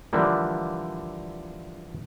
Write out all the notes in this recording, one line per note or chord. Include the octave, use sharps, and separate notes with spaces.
D3 E3 F3 G3 A#3